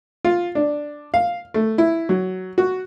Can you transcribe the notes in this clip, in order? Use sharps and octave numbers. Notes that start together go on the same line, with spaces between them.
F4
D4
F5
A3
E4
F#3
F#4